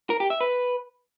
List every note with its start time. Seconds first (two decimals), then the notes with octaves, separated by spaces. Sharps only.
0.10 A#4
0.20 G4
0.30 E5
0.40 B4